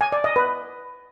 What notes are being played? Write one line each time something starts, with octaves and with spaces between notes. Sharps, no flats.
G#5
D5
D#5
B4